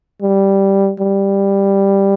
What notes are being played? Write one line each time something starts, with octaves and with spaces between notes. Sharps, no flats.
G3
G3